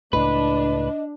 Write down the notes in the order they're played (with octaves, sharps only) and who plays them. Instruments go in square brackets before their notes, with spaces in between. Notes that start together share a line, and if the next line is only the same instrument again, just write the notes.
[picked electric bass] C#2 A2 [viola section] D4 [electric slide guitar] B4 [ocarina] D#5